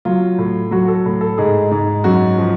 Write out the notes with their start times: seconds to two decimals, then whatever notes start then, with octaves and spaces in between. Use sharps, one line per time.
0.05 F#3 F4
0.38 A2
0.71 F#3 F#4
0.88 A4
1.06 A2
1.21 A4
1.38 G#2 G#4
1.71 G#2
2.04 F#2 F#4
2.38 F3